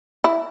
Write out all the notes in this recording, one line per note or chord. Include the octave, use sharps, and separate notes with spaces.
E4